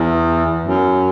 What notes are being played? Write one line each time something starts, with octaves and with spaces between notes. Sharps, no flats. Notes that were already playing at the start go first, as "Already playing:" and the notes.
Already playing: E2
F#2